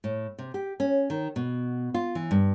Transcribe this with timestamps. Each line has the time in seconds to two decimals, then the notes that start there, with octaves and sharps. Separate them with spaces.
0.04 A2
0.39 C3
0.54 G4
0.80 C#4
1.10 D#3
1.36 B2
1.94 F4
2.15 E3
2.31 G2